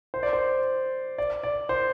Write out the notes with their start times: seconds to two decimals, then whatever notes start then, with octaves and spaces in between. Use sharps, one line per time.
0.14 C5
0.23 D5
0.33 C5
1.18 D5
1.43 D5
1.69 C5